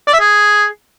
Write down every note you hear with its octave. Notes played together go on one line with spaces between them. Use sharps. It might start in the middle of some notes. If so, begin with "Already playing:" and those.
D5
E5
G#4